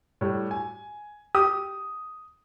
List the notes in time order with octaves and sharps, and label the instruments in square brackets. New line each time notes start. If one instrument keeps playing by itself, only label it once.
[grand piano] A2 G3
G#5
[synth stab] G4 [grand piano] D#6